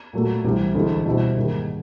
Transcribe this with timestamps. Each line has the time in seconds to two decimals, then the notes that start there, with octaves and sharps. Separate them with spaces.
0.13 A#2 F#3 A3
0.44 C2 C3 E3
0.75 D2 C3 E3 G#3
1.06 B2 G3 C4 E4
1.37 G#2 D#3 G3 A#3